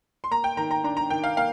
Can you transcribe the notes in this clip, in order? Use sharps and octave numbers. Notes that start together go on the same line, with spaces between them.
C6
A#3 A#5
G5
D#3 A#5
A#5
D4 A#5
A#5
D#3 G5
F5
A#3 F5